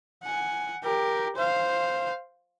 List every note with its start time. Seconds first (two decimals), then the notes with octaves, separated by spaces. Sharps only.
0.24 F#5 G#5
0.84 G4 A#4
1.36 C5 F5